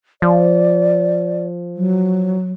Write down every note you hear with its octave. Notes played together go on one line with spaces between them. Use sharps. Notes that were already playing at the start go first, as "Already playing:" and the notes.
F3 D5
F#3